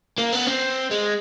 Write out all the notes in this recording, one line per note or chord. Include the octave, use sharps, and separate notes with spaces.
A#3
B3
C4
G#3